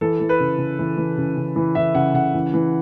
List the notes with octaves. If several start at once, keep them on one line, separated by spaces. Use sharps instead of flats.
E3 A4
E3
B4
C#3
C#3
E3
E3
C#3
C#3
E3
E3 E5
C#3 F#5
C#3 F#5
E3
E3